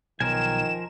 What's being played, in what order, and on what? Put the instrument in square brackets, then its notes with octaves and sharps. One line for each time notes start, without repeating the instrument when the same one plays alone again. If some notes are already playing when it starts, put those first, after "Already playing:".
[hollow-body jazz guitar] B1 [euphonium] D#3 [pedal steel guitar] F3 A#4 G#5 [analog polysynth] E7